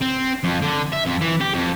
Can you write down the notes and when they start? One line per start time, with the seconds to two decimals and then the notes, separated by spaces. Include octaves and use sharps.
0.02 C4
0.44 F2
0.62 D3
0.93 E5
1.07 F2
1.21 E3
1.41 G4
1.54 F2